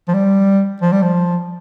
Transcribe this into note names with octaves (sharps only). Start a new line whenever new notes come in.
F3
G3
F3
G3
F3